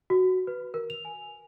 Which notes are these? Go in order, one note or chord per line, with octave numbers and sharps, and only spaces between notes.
F#4
B4
A#4
F7
G#5